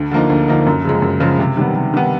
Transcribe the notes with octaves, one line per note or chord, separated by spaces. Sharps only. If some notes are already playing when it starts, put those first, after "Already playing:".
Already playing: D2
D3 F3 A#3 D#4
D2
D3 F3 A#3 D#4
F#2
C#3 F3 G#3
F#2
C#3 F3 G#3
C3
D#3 G3 B3
C3
D#3 G3 B3